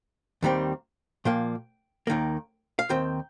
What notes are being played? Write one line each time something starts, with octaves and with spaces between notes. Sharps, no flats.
D#2 D#3 G3 C4
A#2 F3 A#3 G5
D#2 D#3 A#3
F5
D#2 D#3 C4 G5